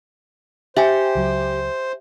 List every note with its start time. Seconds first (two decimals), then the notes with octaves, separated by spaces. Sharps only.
0.77 G4 C5 E5 G#5
1.15 C#2 F#3